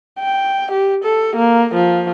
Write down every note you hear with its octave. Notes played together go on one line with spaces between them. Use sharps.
G5
G4
A4
A#3
F3